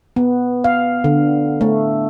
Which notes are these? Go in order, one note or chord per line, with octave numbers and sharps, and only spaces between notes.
B3
F5
D3
A3